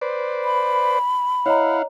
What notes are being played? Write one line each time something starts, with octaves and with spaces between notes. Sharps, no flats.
B4 C5 D5
B5
E4 C#5 D#5 F5 F#5 A#5